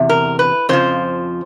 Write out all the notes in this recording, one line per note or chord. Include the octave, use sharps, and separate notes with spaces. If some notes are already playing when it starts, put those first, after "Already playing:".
Already playing: E2 C3
A#4
B4
F2 C#3 F3 C5